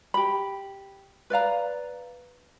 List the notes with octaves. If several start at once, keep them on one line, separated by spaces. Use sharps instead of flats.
G4 B5
B4 D5 F5 A#5